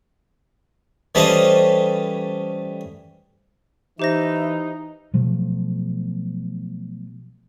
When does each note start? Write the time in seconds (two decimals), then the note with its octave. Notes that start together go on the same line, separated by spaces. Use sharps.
1.15 E3 G3 A3 C#4 C5 D#5
3.99 E3 D#4 G4 C5 E5 A#6
5.14 B2 F3 F#3 A3